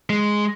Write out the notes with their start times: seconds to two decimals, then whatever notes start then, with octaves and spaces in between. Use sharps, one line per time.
0.10 G#3